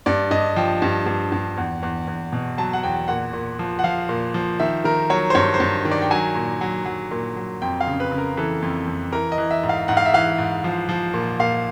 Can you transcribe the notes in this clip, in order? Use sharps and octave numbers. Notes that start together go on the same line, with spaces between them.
G2 D5
G2 D#5
F3 G5
G2
G2
G2
E2
E2
E2
B2
F#3 A5
F#5
E2 G5
A#2 F#5
A#2
F3
F#5
F3 F5
A#2
F3
D#3 E5
D#3 A#4
F#3 C#5
C5
G2 C#5
C5
G2
D#3
D5
G5
F#3 G#5
A#2
F#3
F#3
A#2
F#3
F2 G5
F5
C#3
B4
C#3
A#4
E3 A4
F2
F2
E3 A#4
D#5
E3
E5
G#2
F5
G#2 F#5
F5
E5
E3 F5
G#2
F3
F3
A#2
A#2 F5